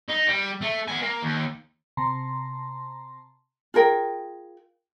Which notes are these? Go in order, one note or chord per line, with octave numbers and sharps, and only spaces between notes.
D#4
G3
A3
B3 G#5
A#3
D#2
C3 A5 A#5 C6
F4 G#4 A#4 G5